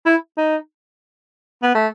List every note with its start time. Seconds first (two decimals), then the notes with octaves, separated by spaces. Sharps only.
0.06 E4
0.38 D#4
1.63 B3
1.75 A3